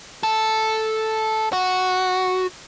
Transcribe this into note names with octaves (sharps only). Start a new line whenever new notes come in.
A4
F#4